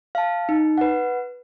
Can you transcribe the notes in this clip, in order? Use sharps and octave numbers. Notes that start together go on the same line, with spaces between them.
F5 A5
D#4
B4 F#5